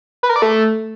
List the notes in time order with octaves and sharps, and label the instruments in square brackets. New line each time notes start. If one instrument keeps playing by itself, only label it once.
[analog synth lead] B4
A#4
D5
A3